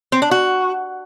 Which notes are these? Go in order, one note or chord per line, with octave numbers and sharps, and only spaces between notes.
C4
D4
F#4